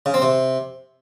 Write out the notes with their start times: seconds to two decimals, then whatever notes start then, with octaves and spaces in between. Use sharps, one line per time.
0.06 C#3
0.14 C4
0.22 C3